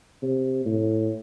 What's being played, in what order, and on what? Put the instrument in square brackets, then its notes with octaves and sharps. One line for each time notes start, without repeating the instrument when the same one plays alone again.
[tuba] C3
A2